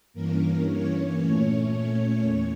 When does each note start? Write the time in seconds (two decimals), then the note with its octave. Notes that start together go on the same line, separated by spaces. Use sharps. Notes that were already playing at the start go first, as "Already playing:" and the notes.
0.14 G2 E3 A#3 C#4 A#4
0.66 C#5
1.18 A#2 A3 C#4
1.71 C#5
2.23 E2